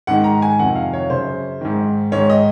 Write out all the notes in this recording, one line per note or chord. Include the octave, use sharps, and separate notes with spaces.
G#2 D#3 F#5
A#5
G#5
F2 C3 D#3 F#5
F5
C#5
F#2 C#3 C5
G#2 D#3
G#2 D#3 C#5
D#5